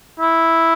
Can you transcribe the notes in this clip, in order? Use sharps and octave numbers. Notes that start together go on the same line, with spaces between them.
E4